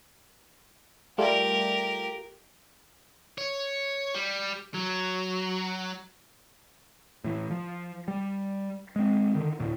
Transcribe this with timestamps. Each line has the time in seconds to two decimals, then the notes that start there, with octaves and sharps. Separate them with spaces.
1.18 G3 A3 F4 G4 A#4
3.38 C#5
4.15 G3
4.75 F#3
7.24 A2 E3
7.51 F3
8.08 G3
8.96 G#3 C4
9.35 D3 D#3
9.60 D2 A2